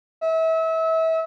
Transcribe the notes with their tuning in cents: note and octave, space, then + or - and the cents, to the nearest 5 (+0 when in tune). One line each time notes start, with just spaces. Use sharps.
E5 -30